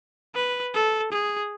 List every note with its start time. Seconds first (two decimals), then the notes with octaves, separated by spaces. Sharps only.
0.35 B4
0.74 A4
1.12 G#4